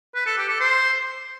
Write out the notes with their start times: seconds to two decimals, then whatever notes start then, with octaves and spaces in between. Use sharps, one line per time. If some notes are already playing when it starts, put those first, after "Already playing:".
0.15 B4
0.26 A4
0.38 G4
0.49 A4
0.60 C5